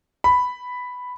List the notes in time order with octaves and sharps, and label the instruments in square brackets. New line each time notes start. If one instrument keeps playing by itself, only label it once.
[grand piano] B5